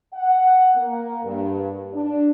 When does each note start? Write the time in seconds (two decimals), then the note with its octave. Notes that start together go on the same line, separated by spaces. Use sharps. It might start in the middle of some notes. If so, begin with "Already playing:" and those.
0.13 F#5
0.76 A#3
1.24 G2
1.94 D4